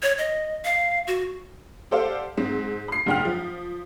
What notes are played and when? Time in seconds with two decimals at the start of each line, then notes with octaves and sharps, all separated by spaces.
0.03 C#5
0.18 D#5
0.65 F5
1.07 F#4
1.91 G4 A4 C5 D5 F5 F#5
2.37 G#2 C4
2.88 B5 C7
3.06 F#1 G#2 F#5 G5 F6
3.25 F3